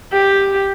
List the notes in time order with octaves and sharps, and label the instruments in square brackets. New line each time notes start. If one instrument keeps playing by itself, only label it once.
[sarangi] G4